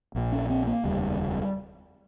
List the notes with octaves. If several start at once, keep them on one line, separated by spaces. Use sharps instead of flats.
A#1 A#2
C#4
C4
A#3
F1 D#2 C#3 G3